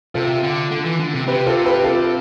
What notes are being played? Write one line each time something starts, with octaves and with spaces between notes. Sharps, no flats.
C3 F4 A4
D3
D3
E3
D3
C3
C3 G4 B4
F4 A4
G4 B4
F4 A4